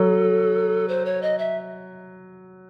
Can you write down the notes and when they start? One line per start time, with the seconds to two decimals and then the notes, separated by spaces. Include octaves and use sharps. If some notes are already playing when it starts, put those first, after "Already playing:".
Already playing: F#3 A4
0.88 C5
1.05 C#5
1.22 D#5
1.38 E5